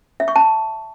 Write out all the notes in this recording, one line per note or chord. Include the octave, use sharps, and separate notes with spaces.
E5
C#6
A5